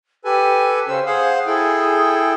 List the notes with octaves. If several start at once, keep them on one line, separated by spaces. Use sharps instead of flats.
G4 A4 B4 G#5
C#3 C#4 C5 E6
G#4 C5 F5 F#5
E4 G#4 A4 G5